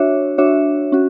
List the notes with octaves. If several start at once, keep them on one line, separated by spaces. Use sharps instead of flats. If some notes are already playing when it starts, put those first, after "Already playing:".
Already playing: D4 F#4 C#5 E5
D4 F#4 C#5 E5
C#4 F#4